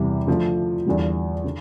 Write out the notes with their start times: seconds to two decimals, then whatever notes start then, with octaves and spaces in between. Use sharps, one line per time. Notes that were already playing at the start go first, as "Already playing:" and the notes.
Already playing: E2 C3 E3 G3
0.27 D3 F3 A3
0.86 E2 D3 G3
1.44 D3